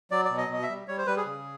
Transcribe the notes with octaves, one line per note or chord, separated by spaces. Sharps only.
F#3 D5
D5
B2
D#5
B2 D#5
E5
G3
G3 C#5
C5
G3 B4
G#4
C#3